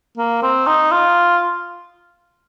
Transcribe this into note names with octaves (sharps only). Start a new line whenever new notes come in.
A#3
C4
D#4
F4